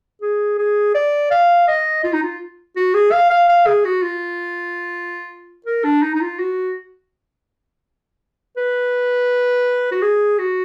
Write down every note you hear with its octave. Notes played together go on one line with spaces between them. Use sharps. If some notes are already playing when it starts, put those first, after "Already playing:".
G#4
G#4
D5
F5
D#5
F4
D#4
F4
F#4
G#4
F5
F5
F5
G#4
F#4
F4
A#4
D4
D#4
D#4
F4
F#4
B4
F#4
G#4
F#4